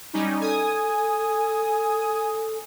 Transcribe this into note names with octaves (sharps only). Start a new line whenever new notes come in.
G3 C#4 D#4
A4 G#5 D#6